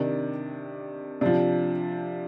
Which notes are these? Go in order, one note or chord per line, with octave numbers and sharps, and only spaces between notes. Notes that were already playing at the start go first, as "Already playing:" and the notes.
Already playing: C3 D#3 D4
C3 F3 D4